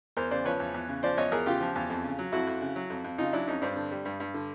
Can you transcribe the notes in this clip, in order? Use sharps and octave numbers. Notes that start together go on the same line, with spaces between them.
E2 A#4 C5
C#3 C5 D5
F3 B4 C#5
E2
E2
C#3
F3 C5 D5
E2 C#5 D#5
E2 G#4 A#4
C#3 F4 G4
F3
E2
F2
C#3
F#3
F2 E4 F#4
F2
C#3
F#3
F2
F2
C#3 D#4 F4
F#3 D4 E4
F2 C#4 D#4
G2 C4 D4
D3
G3
G2
G2
D3